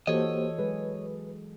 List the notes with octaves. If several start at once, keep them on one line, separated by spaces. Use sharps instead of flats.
E3 A#3 F#4 G4 A4 C5 C#5 D#5
F#3 G#3 G#4 B4